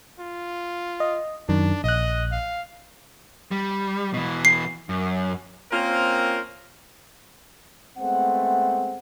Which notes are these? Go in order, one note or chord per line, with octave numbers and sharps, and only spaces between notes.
F4
D#5
F#2 D#3 D4
A#1 D#5 F#6
F5
G3
B2 E3
C7
F#2
A#3 C4 C#4 F4 A#4 C5
G#3 A3 B3 C4 F#5